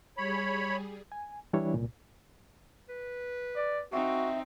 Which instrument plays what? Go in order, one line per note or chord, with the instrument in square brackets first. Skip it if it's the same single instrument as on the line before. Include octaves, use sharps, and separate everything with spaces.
[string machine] G3 G#4 [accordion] C#5 B5
[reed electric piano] G#5
E3 G3 D4 E4 C#5
C2 A#2
[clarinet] B4
[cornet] D5
[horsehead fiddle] C4 D#4 [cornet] F#4 [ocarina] E5